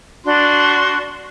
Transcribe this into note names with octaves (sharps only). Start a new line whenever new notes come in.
D4 F#4 C6